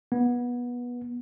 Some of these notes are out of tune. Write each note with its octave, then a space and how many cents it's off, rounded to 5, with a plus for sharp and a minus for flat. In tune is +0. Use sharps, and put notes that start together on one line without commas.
B3 -20